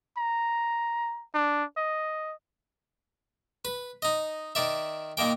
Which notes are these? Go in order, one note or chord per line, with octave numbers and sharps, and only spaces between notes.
A#5
D4
D#5
B4
D#4 D#5
D#3 D5 E5
A#2 D#3 A#3 G5